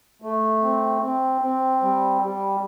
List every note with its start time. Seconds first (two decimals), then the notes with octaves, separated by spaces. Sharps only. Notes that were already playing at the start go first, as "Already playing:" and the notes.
0.22 A3
0.62 C4
1.01 C4
1.41 C4
1.82 G3
2.21 G3